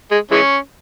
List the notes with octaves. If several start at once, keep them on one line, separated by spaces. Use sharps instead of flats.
G#3
E3 G#3 C#4